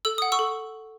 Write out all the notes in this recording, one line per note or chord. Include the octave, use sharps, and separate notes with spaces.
A4 E6
F#5 D#6
C#6 E6
A4